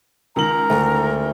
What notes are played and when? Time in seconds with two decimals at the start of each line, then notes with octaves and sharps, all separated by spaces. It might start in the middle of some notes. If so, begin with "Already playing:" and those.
0.36 C#2 D#3 A#4 A#5 F#7
0.70 D2